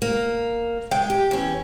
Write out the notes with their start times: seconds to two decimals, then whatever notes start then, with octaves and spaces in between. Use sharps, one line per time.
0.02 A#3
0.91 G#3 G5
1.10 G4
1.31 E2 C#4